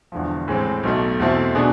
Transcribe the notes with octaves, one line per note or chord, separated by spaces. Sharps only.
E1 E2 D3 F3
A2 E3 G#3 C4
B1 B2 A3
E2 B2 A3 C4 E4
B2 B3 D4 G#4